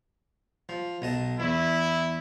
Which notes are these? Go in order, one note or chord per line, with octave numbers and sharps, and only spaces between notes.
F3
B1 D#5 A5
E2 E4